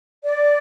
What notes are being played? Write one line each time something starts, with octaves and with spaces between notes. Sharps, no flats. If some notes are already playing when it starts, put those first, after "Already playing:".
D5